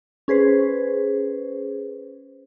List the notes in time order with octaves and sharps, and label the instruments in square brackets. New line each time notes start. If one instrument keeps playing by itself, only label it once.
[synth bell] C#4 G#4 B4 C5